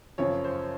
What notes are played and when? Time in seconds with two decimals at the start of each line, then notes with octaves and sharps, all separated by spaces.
0.18 F#2 C#3 F3 C#5
0.45 C5